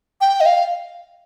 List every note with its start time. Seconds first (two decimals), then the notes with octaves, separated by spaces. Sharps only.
0.21 G5
0.41 D#5
0.46 F5